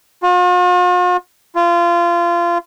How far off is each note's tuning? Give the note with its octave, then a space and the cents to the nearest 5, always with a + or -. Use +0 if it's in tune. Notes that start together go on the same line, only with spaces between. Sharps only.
F4 +45
F4 -25